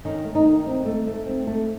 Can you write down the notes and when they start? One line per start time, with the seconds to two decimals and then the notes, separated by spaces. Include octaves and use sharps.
0.05 D#3 C#4
0.24 A3
0.35 D#4
0.45 D#3
0.66 C4
0.85 A3
1.07 A3
1.26 C4
1.47 A3